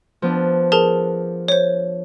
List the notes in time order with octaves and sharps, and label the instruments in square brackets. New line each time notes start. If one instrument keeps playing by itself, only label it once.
[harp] F3 B3 D4
[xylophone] G#4 A#4 A5
C5 C#5